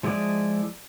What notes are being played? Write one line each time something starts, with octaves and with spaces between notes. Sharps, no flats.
F3 G#3 E4 D5 D#6